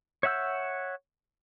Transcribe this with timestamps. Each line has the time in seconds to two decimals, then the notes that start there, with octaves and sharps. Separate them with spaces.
0.23 C#5 E5 F#5 E6 G6